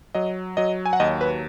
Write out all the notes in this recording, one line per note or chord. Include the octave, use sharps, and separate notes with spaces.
F#3 D#5
F#3 D#5
G#5
F#5
D#2 D#5
B4